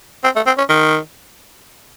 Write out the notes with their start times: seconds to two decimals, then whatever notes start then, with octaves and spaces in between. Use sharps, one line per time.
0.24 C4
0.36 A3
0.46 C4
0.58 C#4
0.69 D#3